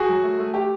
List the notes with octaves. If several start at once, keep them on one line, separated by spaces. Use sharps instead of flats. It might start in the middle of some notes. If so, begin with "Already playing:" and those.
Already playing: F#4 G#4
F#3
A3
A3
G4